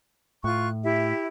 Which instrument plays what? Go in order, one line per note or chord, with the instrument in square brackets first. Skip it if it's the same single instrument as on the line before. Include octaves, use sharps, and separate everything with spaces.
[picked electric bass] A2 [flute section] F4 C#6 F#6
[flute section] E4 G4 E5